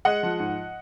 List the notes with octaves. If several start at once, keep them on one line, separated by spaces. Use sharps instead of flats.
G#3 D#5 F#5
F3
G#2